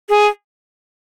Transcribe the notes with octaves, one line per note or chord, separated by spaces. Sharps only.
G#4